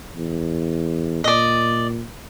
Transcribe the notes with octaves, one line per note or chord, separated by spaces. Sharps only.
E2
A#2 D5 D#5